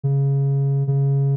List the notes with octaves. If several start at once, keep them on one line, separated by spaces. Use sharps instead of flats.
C#3
C#3